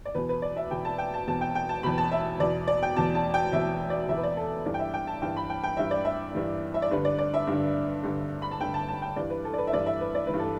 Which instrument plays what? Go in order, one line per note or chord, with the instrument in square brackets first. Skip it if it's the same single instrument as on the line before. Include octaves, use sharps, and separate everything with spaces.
[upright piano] D5
E2 B2 B4
B4
D5
E5
E2 B2 G5
A5
G5
A5
E2 B2 A5
G5
G5
A5
E2 B2 B5
A5
E5
E2 B2 D5
D5
G5
E2 B2 A5
A5
G5
E2 B2 E5
D5
E2 B2 E5
B4
D5
A4
G2 E3 D5
G5
E5
G5
A5
G2 E3 G5
B5
G5
G5
G2 E3 E5
D5
E5
G2 E3
E5
D5
G2 D3 B4
D5
D5
E5
G2 D3
G2 D3
B5
A5
G2 D3 G5
A5
A5
G5
G2 E3 D5
B4
A4
D5
B4
E5
G2 E3 D5
E5
B4
D5
E3 B4
G2
A4